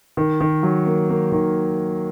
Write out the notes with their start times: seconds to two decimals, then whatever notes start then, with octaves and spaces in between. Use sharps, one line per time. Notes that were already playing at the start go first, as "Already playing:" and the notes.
0.17 D#3
0.40 D#3
0.63 F#3
0.86 A#3
1.10 A#3
1.32 D#3